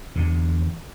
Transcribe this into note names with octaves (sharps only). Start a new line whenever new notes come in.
E2 D3